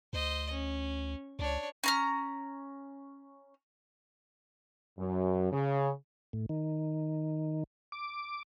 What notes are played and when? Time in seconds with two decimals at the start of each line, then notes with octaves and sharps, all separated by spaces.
0.13 D2 C5 D#5
0.52 C#4
1.39 C#2 D4 C#5
1.84 C#4 A#5 F6
4.99 F#2
5.52 C#3
6.33 A2
6.49 D#3
7.92 D6